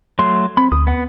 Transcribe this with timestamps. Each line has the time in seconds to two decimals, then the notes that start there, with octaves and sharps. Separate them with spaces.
0.19 F#3 A3 C6
0.57 C4 B5
0.72 D2 D#6
0.87 B3 F#5